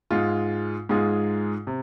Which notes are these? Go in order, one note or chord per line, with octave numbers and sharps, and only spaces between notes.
G#2 G#3 F4
G#2 G#3 F4 G#4
C3